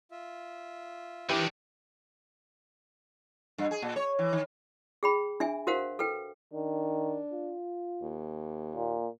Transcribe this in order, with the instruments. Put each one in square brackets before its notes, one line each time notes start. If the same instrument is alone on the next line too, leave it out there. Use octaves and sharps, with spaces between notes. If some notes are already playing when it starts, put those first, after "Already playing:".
[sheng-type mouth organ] F4 E5
[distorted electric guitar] D#3 D4 [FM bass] E3 [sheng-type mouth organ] C#4 B4 D5 [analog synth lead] G4
[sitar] G2
G#4
A#2
C#5
E3
D#3
[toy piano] G#4 G5 B5
D4 E5 G#5
F#4 A#4 C5 F5 F#5
A4 B4 G5
[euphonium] D#3 [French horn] D4
[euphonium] F4
[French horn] D#2
[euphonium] A#2